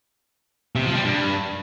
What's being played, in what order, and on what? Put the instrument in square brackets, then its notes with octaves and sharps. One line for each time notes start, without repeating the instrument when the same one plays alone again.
[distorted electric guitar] C3
F3
G3
G2